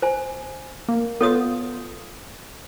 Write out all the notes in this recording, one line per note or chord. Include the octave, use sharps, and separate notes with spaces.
C5 G#5
A#3
B3 F4 A4 C#5 D#6